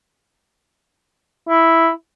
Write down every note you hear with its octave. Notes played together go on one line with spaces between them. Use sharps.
E4